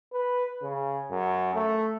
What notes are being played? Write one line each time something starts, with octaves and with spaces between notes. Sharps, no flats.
B4
C#3
F#2
A3